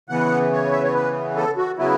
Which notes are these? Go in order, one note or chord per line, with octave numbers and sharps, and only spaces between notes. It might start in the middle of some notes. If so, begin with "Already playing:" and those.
C#3 E3 B3 F#5
C#5
E5
C#5
B4
A4
F#4
C#3 F#3 B3 E4